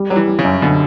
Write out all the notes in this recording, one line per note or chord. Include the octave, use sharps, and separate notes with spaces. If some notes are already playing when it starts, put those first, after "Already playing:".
Already playing: G3
F#3 G3
E3
G3
C#3
F#2
B2 D3